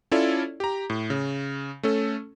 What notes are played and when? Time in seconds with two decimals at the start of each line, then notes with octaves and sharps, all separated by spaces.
0.12 C#4 E4 F4 A4 C#5 D5
0.60 G4 A#5
0.90 A2
1.10 C#3
1.83 A3 C#4 A4